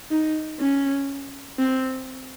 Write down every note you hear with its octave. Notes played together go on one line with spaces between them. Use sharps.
D#4
C#4
C4